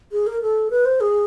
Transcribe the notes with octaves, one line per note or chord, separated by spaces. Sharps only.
G#4
A#4
A4
B4
C5
G#4